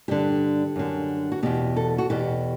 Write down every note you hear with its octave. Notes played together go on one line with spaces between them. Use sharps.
G2 D3 G4
F#2 D3
F#4
E2 B2 G4
A4
F#4
E2 B2 G4